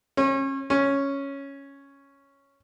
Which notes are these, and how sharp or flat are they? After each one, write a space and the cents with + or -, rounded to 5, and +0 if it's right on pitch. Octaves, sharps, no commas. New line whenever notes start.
C#4 -30
C#4 +0